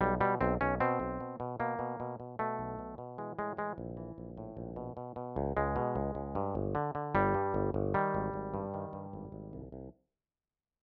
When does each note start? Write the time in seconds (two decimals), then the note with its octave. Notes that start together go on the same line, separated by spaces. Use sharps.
0.01 B1 G3
0.20 B2 G3
0.41 B1 C4
0.61 B1 C#4
0.80 B2 C4
1.00 B1
1.20 B2
1.40 B2
1.60 B2 A#3
1.79 B2
2.00 B2
2.20 B2
2.39 B2 A3
2.59 B1
2.79 B2
2.98 B2
3.18 E3 G#3
3.39 A2 G#3
3.57 E3 G#3
3.78 A#1
3.97 E3
4.18 A#1
4.37 A2
4.57 A#1
4.76 B2
4.97 B2
5.16 B2
5.36 C#2
5.57 C#2 G#3
5.76 B2
5.96 C#2
6.15 C#2
6.35 G2
6.55 G1
6.75 D3
6.95 D3
7.15 G1 G3
7.34 G2
7.54 G1
7.74 G1
7.94 D#3 G3
8.15 G#1
8.34 G#1
8.54 G2
8.74 D#3
8.93 G2
9.13 G#1
9.32 G#1
9.53 C2
9.72 C2